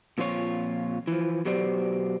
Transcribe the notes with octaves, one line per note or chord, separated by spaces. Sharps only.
A#2 F3 C4 F4 C#5
E3 F3
B2 F#3 G4 C5 D5